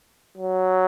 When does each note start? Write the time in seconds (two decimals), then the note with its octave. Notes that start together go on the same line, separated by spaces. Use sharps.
0.37 F#3